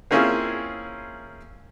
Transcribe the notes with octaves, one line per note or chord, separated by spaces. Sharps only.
A#3 C4 C#4 E4 F4 G#4